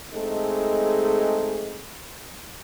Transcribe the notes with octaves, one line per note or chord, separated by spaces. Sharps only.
G#3 A3 C4 D#4 G#4 A4